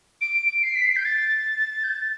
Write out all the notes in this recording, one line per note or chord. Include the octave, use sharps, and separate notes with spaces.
D7
D7
C7
B6
C7
G6
A6
G6
A6